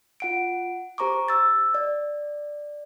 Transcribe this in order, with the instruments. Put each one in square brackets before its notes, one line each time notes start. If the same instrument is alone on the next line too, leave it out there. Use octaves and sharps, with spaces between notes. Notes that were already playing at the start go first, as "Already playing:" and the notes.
[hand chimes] F4 F#5 D7
G4 C5 A#5 C#6 D6
E6 A6
D5